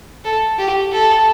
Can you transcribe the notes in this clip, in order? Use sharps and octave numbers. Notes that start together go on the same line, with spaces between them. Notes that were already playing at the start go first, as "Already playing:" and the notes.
A4
G4
A4